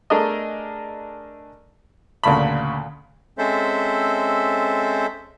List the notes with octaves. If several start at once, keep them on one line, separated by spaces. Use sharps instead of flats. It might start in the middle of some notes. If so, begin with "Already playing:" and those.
A3 D4 G#4 A#4 D#5
D2 A#2 C#3 A5 B5
G#3 C4 C#4 A4 C5 E5